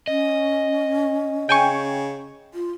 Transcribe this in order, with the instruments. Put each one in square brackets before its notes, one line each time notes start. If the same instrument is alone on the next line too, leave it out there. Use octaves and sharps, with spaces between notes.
[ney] C#4 [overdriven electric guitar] D#5
[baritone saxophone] C#3 [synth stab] G5 G#5 C#6
[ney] F4